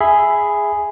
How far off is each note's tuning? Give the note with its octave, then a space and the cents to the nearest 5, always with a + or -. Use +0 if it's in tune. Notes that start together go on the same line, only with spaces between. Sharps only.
G#4 +0 E5 +0 B5 +15